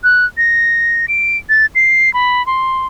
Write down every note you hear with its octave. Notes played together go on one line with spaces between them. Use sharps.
F#6
A#6
D7
A6
C7
B5
C6